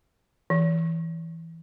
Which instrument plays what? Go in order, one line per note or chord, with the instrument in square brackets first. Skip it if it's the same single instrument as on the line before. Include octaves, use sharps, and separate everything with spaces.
[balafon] E3